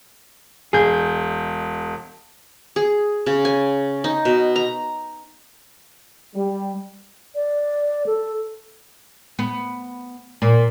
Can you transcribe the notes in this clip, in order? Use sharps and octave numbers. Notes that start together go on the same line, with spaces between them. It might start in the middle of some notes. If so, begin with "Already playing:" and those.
E1 G#4 G6
G#4
C#3
G#5
D#4
B2
A#5
G3
D5
A4
B3
A#2